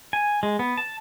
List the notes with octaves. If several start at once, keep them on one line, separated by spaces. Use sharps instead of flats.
G#5
G#3
B3
A5